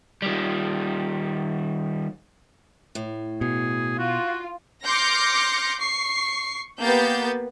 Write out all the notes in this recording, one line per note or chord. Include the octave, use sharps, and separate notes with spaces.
D#3 G3
A2
B2 G#4
F4 F#4
C6 D6 F6 G6 A#6 C#7
C#6 C7
A#3 B3 G4 G6 A6